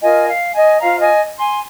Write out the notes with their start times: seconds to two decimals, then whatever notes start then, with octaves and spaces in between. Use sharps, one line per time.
0.02 F4 A#4 D#5 G#5
0.28 F5
0.53 D#5 G#5
0.80 F4 C5 F5 A#5
1.00 D#5 G#5
1.39 G#5 C6